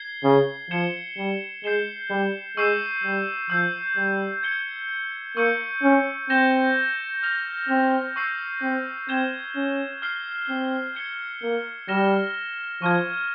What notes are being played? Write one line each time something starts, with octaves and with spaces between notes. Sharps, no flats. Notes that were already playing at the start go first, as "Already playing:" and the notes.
Already playing: G#6 C7 G7
C#3
F3 G#6 C#7 E7 G7
G3
G#3 G6 C7 E7 G7
G3
G#3 C#6 E6 G6 C7 E7
G3
F3 E6 G6 C7
G3
G#6 C#7 G7
A#3 C#6 E6 G6 C#7
C#4
C4 G6 A#6 E7 G7
F6 A#6 F7
C4
C#6 E6 G6 C7
C4
C4 G#6 E7 G7
C#4
F6 C7 G7
C4
G#6 C#7 G7
A#3
G3 F6 A#6 E7 G7
F3 C#6 F6 G#6